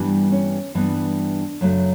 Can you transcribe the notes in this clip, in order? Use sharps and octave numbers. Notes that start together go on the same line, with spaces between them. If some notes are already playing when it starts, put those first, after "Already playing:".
Already playing: G2 E3 G3 B3 D4
C#4
G2 E3 G3 B3 D4
F#2 C#3 F#3 A3